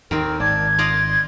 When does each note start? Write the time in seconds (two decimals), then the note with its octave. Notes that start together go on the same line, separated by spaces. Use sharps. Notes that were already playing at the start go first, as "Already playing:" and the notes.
0.11 D#2 D#3 C4 A#4
0.40 G#1 D5 A5 G#6
0.79 F4 D5 D#5 C6